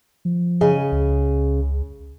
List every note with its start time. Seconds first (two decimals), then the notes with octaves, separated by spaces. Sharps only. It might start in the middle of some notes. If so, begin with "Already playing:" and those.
0.25 F3
0.61 C#3 G#4 D#5
0.92 C#2